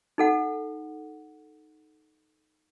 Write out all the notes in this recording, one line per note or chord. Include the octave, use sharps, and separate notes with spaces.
D#4 A4 F#5